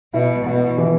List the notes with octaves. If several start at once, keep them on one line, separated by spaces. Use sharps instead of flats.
B2 E4
B2 B3
E3